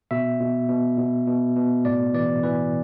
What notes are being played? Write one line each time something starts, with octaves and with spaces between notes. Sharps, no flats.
B2 E5
B2
B2
B2
B2
B2
A2 D5
E3 D5
E3 B4